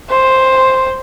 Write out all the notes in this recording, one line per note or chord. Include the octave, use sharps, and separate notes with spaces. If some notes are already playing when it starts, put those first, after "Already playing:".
C5